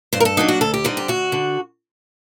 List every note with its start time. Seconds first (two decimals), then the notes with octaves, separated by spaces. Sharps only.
0.13 G2 C5
0.20 A#4
0.25 A4
0.37 F#3 A#3 D4 D#4
0.48 F#4
0.61 D2 A4
0.74 G4
0.84 D3 G3 C4 D#4
0.97 G4
1.08 D2 F#4
1.32 D3